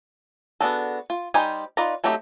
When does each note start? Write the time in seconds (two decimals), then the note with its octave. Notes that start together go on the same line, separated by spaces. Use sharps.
0.60 B3 D4 F#4 G#4 A4
1.10 F4
1.34 G3 D#4 G4 C5 G#5
1.77 D#4 F4 B4 D5 A#5
2.04 F#3 A3 C4 D#4 G4